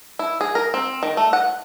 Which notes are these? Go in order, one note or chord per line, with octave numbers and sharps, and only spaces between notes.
E4
G#4
A#4
C4
D#3
A3
F#5